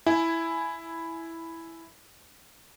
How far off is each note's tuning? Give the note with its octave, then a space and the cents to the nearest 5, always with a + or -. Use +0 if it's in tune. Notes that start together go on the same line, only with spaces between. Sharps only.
E4 +0 G#5 +15